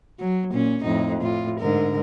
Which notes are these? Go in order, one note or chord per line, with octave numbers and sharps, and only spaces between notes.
F#3
A#2 C#4
F2 A2 D#4
A2 F4
G#2 D3 A#4